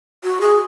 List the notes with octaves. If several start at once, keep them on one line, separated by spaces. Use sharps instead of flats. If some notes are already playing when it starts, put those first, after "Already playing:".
F#4
G#4